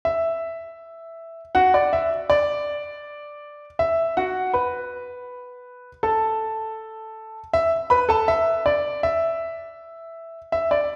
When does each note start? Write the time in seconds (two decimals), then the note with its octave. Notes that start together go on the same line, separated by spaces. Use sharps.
0.05 E5
1.55 F#4 F#5
1.74 D5
1.93 E5
2.30 D5
3.79 E5
4.17 F#4 F#5
4.53 B4 B5
6.03 A4 A5
7.53 E5
7.90 B4 B5
8.09 A4 A5
8.28 E5
8.66 D5
9.03 E5
10.52 E5
10.71 D5